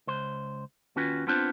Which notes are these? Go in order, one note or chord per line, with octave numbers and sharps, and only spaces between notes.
C#2 C5
D#2 D#3 C#4 F4 F#4 B4
B3 C4 D4 F4 B4 C5